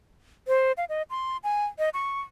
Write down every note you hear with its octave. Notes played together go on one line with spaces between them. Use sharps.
C5
F5
D#5
C6
G#5
D#5
C#6